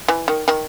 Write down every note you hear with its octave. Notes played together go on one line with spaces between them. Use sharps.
E3
D#3
D#3